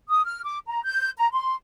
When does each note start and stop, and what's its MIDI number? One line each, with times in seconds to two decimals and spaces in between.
0.09 0.24 87
0.25 0.41 89
0.44 0.59 86
0.68 0.81 82
0.83 1.10 91
1.17 1.29 82
1.33 1.53 84